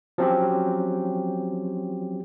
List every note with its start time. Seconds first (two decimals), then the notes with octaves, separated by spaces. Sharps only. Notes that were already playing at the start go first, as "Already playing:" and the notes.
0.18 F3 F#3 C4 C#4 F4 G4